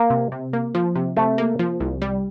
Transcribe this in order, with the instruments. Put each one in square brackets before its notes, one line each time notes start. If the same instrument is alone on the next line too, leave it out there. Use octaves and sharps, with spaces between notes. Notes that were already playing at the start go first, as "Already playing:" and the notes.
Already playing: [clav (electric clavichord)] A#3
[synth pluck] C3
C3
A#3
F3
C3
[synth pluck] C3 [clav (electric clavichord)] A3
[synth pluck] A#3
F3
C2
G3